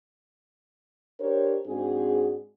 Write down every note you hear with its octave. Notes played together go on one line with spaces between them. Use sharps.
D4 G4 A#4 C5 C#5
G#2 C4 D4 F#4 G#4